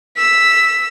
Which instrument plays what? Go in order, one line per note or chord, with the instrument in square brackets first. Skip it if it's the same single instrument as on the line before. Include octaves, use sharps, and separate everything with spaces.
[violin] E6 B6